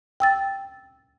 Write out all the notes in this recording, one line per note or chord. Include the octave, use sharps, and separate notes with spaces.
G5 E6 A6